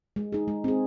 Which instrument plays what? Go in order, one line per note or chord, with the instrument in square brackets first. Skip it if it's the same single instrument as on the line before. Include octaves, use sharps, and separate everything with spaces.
[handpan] G#3
D#4 G#4
G#3
C4 G#4